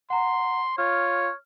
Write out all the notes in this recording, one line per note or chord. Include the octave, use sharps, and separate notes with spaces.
F#5 A#5 C6
F4 C#5 F6